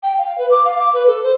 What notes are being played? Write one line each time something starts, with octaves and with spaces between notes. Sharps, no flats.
G5
F5
B4
D6
F5
D6
B4
A4
C5